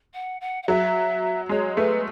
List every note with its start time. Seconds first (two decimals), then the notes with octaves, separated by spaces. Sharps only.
0.14 F#5
0.40 F#5
0.63 F#5
0.68 F#3 E5
1.49 G#3 C#5
1.76 A3 B4